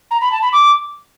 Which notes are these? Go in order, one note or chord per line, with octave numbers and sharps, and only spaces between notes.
A#5
B5
A5
B5
D6